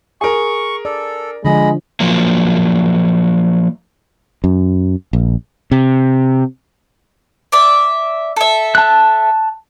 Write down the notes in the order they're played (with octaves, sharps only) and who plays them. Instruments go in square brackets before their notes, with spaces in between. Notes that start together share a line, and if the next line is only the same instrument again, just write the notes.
[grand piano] G#4 A#4 [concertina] C#6
[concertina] A4 [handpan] D5
[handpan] D3 F3 [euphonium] G#3 [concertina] D#5 B5
[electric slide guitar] F3 F#3 A#3
[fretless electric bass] F#2
A#1
[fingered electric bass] C3
[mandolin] D5 E5
A4 E5
[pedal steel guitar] A5 F#6